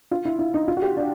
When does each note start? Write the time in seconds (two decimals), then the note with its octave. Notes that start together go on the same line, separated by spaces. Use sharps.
0.11 F4
0.25 E4
0.39 E4
0.54 D#4
0.68 F4
0.77 F#4
0.82 G4
0.97 D4